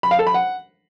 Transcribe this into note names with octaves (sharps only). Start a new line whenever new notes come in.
B5
F5
A4
B5
F#5